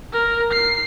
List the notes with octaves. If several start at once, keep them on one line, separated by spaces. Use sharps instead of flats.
A#4
C7